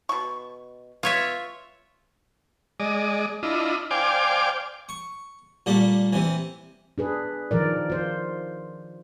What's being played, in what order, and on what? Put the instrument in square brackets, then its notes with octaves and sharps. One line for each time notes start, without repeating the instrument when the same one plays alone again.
[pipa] B2 C#6
[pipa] B3 [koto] F4 C#5 E5
[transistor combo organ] G#3 D5 D#5
D4 E4 F4 D#5
C5 D5 F5 G5 G#5 D6
[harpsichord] C#6
A#2 G3 A3
C3 E3
[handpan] D4 G#4 B4
D#3 F3 A#4 D5
F4 C5